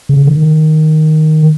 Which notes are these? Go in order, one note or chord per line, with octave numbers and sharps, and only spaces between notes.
C#3
D#3